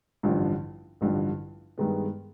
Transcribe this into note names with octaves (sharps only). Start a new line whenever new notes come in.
A1 G2 D3 F3
A1 G2 D3 F3
G2 D#3 G#3 B3